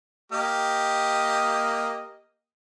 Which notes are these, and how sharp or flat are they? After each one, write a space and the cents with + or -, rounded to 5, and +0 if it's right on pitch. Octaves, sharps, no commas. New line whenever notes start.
A#3 +0 G4 +0 D#5 +0